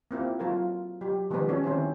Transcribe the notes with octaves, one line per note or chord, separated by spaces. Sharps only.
A#3 C4 E4 F4
F#3 F4 A4 A#4
F#3 G4
D#3 F3 G3 A#3 B3 B4
B3 C#4 F#4 A4 C#5
D#3 C4 C#4 E4 C5